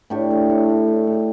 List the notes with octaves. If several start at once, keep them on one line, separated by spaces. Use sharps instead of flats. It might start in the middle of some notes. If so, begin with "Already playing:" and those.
A2 D4 G4
A3
A2
A2
A2
A3